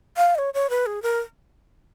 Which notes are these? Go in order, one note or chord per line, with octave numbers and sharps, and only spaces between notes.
F5
D#5
C#5
C#5
B4
G#4
A#4